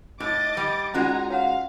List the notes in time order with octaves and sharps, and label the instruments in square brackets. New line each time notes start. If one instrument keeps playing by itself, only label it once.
[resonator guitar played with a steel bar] A2 [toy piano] D#4 [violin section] D#5 D6 A6
[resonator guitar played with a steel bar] G3
[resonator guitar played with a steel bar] G#3 F#4 [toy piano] C#4 F4 D5 [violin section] D#4 G#5 A#5
[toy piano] C#5 F#5 A#5 [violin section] F5